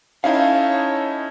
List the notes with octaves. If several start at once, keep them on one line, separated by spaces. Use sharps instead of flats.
C#4 D#4 E4 A4 C#5 F5